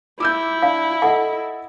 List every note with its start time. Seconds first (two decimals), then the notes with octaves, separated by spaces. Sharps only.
0.20 E4 D6 E6 G6
0.62 D4 F5
1.02 A4 D#5 F#5